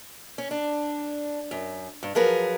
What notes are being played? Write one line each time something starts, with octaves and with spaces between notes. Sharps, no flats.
C#4
D4
F#2
G2
F3 F#3 G#4 A#4 B4